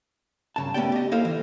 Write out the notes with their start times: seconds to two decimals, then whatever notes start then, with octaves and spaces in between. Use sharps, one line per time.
0.56 G2 C#3 A5
0.74 A3 B3 C#4 G4 D5 G5
0.92 G4 D#5
1.12 A#3 E4 A4 C5 D#5 F5
1.25 E3